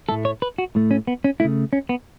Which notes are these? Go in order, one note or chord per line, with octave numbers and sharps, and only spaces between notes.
A2 A3 A4
C#5
B4
F#4
A2 A3
C#4
B3
C#4
C#3 A3 E4
C#4
B3